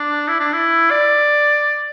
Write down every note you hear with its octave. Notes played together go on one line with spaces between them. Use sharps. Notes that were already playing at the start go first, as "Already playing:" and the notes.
Already playing: D4
E4
D4
E4
D5